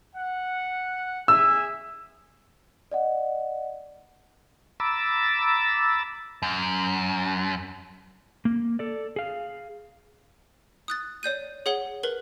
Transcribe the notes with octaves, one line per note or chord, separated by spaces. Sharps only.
F#5
G#4 E5 G#5 E6
D5 D#5 F#5
A#5 B5 D6 E6 A6
F#2
A#3
A4 D5
G#4 F5
D#6 F#6 A6
C#5 D5 G6 D#7
G#4 C#5 F#5 G7
A#4 B4 F#7